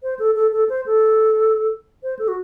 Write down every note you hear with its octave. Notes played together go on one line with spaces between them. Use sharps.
C5
A4
A4
A4
C5
A4
C5
A4
F#4